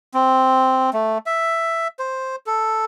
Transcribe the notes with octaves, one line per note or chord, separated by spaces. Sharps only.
C4
A3
E5
C5
A4